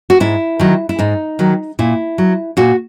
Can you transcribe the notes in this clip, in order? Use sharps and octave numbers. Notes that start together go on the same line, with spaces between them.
F#4
G#2 E4
D#3 F#3
E4
G#2 D#4
D#3 F#3
A#2 E4
F#3
A#2 F#4